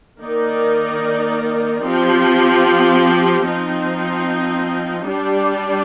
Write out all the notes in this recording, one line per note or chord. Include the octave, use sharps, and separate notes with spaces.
D#3 A#3 D#4 A#4 D5
F3 C4 G4
F3 C4 D#4
G3 D4 G4 D5